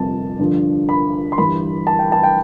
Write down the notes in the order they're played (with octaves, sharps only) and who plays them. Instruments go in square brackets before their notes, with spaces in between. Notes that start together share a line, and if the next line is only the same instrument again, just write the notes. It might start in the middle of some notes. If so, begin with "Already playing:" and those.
Already playing: [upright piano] G1 F2 C3 A5
G2 D3 F3
B5
C6
G1 G2 E3 G3 B5
A5
G5
A5
G5